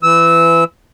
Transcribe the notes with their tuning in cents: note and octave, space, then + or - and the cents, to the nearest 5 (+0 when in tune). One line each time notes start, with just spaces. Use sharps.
E3 +25 E6 -20